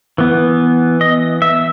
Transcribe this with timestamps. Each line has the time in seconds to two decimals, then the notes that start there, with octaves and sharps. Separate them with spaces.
0.18 E3 B3
1.01 D#5
1.42 E5